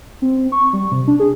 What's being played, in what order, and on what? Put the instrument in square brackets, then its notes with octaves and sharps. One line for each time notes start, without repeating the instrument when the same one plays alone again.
[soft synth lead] C4
C#6
G3
C3
D4
G#4